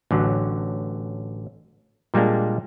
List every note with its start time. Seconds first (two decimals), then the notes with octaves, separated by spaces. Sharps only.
0.11 A1 D3 F#3
2.14 A#2 G3 G#3 A#3 D4